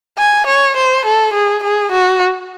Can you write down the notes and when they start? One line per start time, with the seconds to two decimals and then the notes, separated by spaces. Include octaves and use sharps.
0.19 G#5
0.47 C#5
0.77 C5
1.06 A4
1.34 G#4
1.64 G#4
1.92 F#4